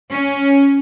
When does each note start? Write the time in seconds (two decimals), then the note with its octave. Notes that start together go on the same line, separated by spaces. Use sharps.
0.11 C#4